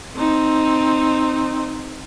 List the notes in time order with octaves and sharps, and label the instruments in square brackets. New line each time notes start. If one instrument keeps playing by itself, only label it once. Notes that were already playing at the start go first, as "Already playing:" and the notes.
[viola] C4 D#4